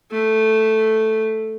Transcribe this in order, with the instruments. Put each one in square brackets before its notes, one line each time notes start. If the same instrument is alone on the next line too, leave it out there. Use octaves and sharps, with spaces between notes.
[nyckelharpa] A3